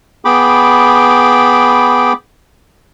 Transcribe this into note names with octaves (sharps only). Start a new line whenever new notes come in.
B3 G#4 G5 B5 D6